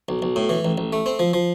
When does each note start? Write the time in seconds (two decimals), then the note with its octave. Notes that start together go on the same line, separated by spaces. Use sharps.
0.09 B1
0.22 B1
0.36 A2
0.49 E3
0.65 A1
0.78 A1
0.93 A3
1.06 C4
1.19 F3
1.33 F3